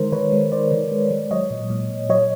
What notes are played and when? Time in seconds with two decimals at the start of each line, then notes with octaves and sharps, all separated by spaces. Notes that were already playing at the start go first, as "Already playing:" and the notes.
Already playing: D#3 G#3 A#4 C5
0.12 D#3 B4 C#5
0.33 G#3
0.52 D#3 C5 D5
0.72 D#3
0.92 G#3
1.11 G#3
1.31 F#3 C#5 D#5
1.51 A#2
1.70 A#2
1.91 A#2
2.09 F#3 C#5 D#5